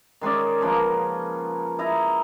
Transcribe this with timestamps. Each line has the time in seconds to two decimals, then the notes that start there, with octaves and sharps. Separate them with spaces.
0.21 D#3 G#3 C#4 D5
0.61 C#3 F3 A#3 B3
1.79 E4 D#5 A#5